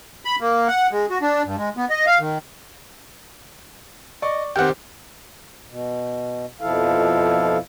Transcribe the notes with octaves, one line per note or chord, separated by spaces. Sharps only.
B5
A#3
F#5
G#3
F#4
D4
G2
G#3
B3
D#5
F5
D#3
D5 D#5 C#6
D#3 C4 G4 F#5 G5
B2
F2 B2 F3 E4 A4 F5